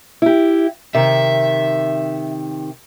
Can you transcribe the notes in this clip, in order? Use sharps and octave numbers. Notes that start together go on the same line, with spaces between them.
E4 G4
C3 D#3 E5